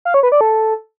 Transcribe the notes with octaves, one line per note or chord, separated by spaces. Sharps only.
F5
C#5
B4
D5
A4